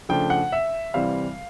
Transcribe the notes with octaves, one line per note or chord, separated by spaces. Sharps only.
C#3 F3 A3 D4 G5
F#5
E5
C3 E3 G3 C4 F5